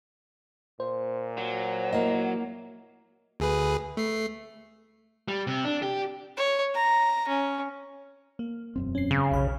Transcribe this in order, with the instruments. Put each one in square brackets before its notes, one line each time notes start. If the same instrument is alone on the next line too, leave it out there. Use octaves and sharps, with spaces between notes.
[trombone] A#2 [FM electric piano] C5
[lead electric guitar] F#3
[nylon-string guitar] A#3 E4 D#5
[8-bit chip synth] D2 G#4 B4
A3 C7
[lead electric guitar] G3
C3
D4
G4
[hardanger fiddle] C#5
A#5
C#4
[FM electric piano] A#3
[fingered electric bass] E1 F#2 C4
[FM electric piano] C#4 C7
[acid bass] C#3
[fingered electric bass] F1 [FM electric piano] B1 B5 F6